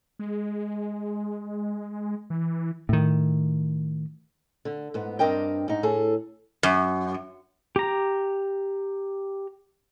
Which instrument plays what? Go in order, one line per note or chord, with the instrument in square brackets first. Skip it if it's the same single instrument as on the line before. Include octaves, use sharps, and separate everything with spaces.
[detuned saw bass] G#3
E3
[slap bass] A2 D#3
[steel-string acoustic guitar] D3
G#2 B3
G2 C4 D4 A#4 D#5 G5
G#2 D#4
A2 G#4 A4
[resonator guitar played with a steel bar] F#2
[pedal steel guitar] G4 A#5